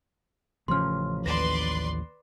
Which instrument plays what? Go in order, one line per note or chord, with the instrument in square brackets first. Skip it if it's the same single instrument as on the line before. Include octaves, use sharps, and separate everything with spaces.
[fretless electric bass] A1 F3 C#4 [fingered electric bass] C#3 [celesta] C6 F6
[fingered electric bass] D#2 [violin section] B4 D5 C6 [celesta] A#6 E7